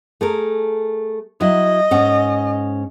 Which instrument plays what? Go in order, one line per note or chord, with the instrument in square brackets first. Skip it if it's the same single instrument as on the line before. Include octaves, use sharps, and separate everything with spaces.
[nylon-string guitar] A3 G#4 A#4
[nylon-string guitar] F#3 E4 [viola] D#5
[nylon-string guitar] G#2 C#4 F#5